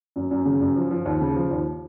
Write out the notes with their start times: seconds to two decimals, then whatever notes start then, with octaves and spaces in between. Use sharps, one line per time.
0.16 F#2
0.31 F#2
0.45 C#3
0.61 F#2
0.76 F3
0.91 F3
1.05 D#2
1.21 C#3
1.35 F3
1.51 D#2